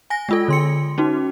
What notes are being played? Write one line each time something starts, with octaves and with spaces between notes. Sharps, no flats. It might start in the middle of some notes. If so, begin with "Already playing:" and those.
G#5 A#6
G#3 F4 A4
D3 C6 C#7
C#4 D#4 F#4